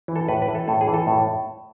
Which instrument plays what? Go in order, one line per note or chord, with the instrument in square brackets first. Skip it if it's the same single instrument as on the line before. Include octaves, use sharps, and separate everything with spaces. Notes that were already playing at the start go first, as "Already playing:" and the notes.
[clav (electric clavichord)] E3
A4
A2 B4
B4
E3
A4
A2 A4
G#4
E3
A4
A2